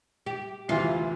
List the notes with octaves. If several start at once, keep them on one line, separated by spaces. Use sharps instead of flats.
G4
D2 C3 E3 F4